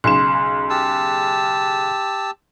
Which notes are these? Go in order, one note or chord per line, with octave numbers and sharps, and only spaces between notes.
B1 C#3 C6 E7
G4 A5 E6